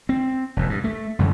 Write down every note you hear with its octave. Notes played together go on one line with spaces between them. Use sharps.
C4
F1 D#2 A2
G2
A3
A1 F#2 D3